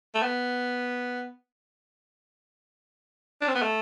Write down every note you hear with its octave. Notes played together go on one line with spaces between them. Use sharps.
A3
B3
D4
C4
B3
A3